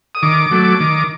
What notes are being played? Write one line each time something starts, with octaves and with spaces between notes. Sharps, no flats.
D#6
D#3 D6
F#3 A3
D#3